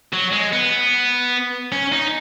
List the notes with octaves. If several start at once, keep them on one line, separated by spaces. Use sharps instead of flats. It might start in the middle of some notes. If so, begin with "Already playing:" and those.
F#3
G#3
B3
C#4
D#4